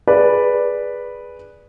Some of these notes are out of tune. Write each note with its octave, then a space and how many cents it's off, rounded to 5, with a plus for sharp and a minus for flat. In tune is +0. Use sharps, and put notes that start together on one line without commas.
G#4 +0 B4 -5 D5 +0